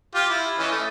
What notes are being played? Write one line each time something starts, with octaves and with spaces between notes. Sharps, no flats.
F4 G4
E4
E3 C#4 D#5
A3